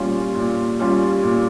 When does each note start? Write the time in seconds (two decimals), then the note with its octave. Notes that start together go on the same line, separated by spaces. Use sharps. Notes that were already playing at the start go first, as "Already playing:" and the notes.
Already playing: A#2 G3 C#4 F4
0.35 A#2
0.79 G3 C#4 F4
1.23 A#2